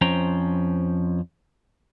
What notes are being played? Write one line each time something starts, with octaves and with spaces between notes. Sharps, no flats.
F2 F3 C#4 C5 G5 A#5